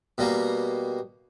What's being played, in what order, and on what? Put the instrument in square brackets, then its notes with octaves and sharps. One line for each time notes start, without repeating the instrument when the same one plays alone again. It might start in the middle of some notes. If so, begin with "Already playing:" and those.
[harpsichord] B2 G3 A#3